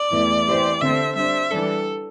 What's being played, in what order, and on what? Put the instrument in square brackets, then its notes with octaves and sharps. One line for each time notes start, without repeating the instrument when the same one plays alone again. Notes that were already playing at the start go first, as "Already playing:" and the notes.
Already playing: [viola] D5
[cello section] E2 E3 A3
E3 C4 G4 C5
[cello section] D3 C4 A4 C5 [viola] E5
[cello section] G3 D4 C5 [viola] E5
[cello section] E3 G3 D4 [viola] A4